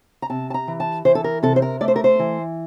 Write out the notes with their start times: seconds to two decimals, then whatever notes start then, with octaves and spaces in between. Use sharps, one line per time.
0.22 A#5
0.30 C3 A5
0.50 A5
0.54 A#5
0.68 E3
0.80 A5
1.05 E3 C5
1.15 A4
1.24 A#4
1.43 C3 A4
1.56 C5
1.62 A#4
1.81 A3 D5
1.88 C5
1.96 A#4
2.04 C5
2.19 E3